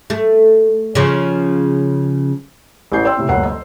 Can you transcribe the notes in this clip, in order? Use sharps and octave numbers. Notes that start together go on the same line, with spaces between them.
A3
C#3 F3
A1 E3 G6 C7
C5 D5 G5 C6 E6
A2 C3
G1 D2 F#3 A#3 F#5 C7
C5 D#5